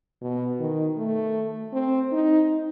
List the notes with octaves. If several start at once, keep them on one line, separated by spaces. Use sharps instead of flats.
B2
D#3
A3
C4
D#4